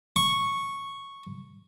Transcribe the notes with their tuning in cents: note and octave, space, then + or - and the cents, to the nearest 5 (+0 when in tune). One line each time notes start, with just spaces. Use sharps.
C#6 -5